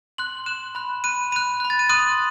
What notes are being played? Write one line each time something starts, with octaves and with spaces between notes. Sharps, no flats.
C6 F#6 F#7
C6 F#6 E7
B5 F#6
B5 F#6 D#7
B5 F#6 D#7
B5 F#6
A6
D#7
C6 D#6 F#6 D#7